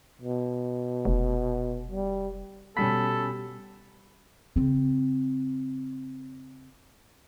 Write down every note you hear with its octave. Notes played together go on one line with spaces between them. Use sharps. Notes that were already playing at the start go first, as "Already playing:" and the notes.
B2
F1
G3
B2 G3 C#4 A4 B5 B6
C#3 C4